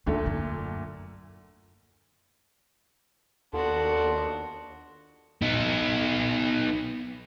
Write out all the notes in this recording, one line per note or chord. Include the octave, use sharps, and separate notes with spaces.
D#2 A#2 D3 A3
F#2
D#2 B3 D4 F4 F#4 A4
B3 D#4